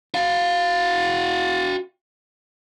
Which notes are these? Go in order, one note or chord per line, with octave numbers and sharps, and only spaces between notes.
F#4 F5